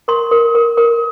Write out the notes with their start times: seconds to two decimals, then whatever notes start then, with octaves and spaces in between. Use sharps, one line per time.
0.08 A#4 C6
0.31 A#4
0.55 A#4
0.77 A#4